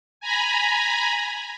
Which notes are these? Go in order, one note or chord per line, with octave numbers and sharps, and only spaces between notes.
G#5 A#5 B5